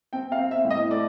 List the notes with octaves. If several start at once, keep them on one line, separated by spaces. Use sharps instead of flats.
C4 G5
F5
C4
E5
A2
D#5
A3 D5